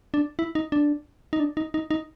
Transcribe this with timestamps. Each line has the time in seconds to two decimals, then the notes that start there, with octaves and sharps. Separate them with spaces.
0.14 D4
0.39 E4
0.55 D#4
0.72 D4
1.33 D#4
1.40 D4
1.57 D#4
1.74 D#4
1.91 D#4